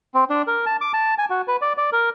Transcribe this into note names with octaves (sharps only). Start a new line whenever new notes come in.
C4
D4
A#4
A5
D6
A5
G#5
F#4
B4
D5
D5
A#4